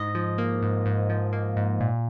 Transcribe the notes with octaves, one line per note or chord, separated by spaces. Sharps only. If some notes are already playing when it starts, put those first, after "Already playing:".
Already playing: G#2 D#5
F3
A#3
G#2
G#2
F3
A#3
G#2
A#2